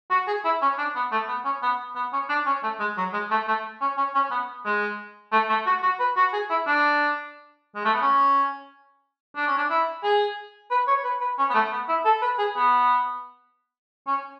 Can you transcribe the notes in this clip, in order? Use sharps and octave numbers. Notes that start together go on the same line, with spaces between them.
F#4
G#4
E4
C#4
D4
B3
A3
B3
C#4
B3
B3
C#4
D4
C#4
A3
G#3
F#3
G#3
A3
A3
C#4
C#4
C#4
B3
G#3
A3
A3
F#4
F#4
B4
F#4
G#4
E4
D4
G#3
A3
B3
C#4
D4
C#4
D4
E4
G#4
B4
C#5
B4
B4
C#4
B3
A3
B3
E4
A4
B4
G#4
B3
C#4